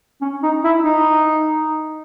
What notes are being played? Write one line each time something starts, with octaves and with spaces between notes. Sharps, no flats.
C#4
D#4
E4
D#4